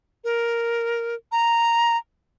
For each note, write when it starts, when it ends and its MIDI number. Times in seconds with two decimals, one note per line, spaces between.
0.24 1.15 70
1.32 1.97 82